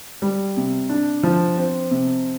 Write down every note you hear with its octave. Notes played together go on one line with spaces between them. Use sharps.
G3
C3
D4
F3
C4
C3